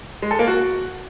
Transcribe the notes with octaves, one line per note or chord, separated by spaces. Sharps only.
G#3
A4
A#3
F#4